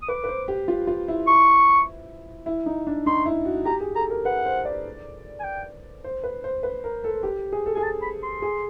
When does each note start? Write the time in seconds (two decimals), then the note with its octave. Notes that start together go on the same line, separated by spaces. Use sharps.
0.02 D#6
0.08 B4 D6
0.24 B4
0.28 C5
0.48 G4
0.68 F4
0.87 F4
1.08 E4
1.28 C#6
2.46 E4
2.66 D#4
2.87 D4
3.06 D#4 C6
3.26 E4
3.45 F#4
3.65 G4 A#5
3.81 G#4
3.95 A4 A#5
4.10 A#4
4.25 B4 F#5
4.46 C5
4.65 D5
5.40 G#5
5.44 G5
6.04 C5
6.24 B4
6.44 C5
6.63 B4
6.84 A#4
7.04 A4
7.23 G4
7.53 G#4
7.66 A4
7.75 G#4 G#5
7.83 A5
8.02 B5
8.23 C6
8.42 G#4